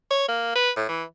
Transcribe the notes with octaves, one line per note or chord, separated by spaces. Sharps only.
C#5
A#3
B4
A2
E3